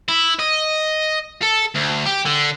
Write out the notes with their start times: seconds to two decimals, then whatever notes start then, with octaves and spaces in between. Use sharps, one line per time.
0.09 E4
0.39 D#5
1.42 A4
1.75 D2
2.06 G4
2.26 D3